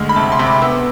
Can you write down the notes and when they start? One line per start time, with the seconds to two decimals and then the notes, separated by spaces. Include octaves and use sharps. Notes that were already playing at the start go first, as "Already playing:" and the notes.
Already playing: D2 G#3 F6
0.09 B5
0.16 C3 A5
0.32 C6
0.39 C3
0.47 D6
0.62 B3 E6